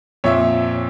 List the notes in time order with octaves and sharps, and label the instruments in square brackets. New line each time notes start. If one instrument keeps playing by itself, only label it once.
[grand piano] F2 A#2 [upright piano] C#5 E5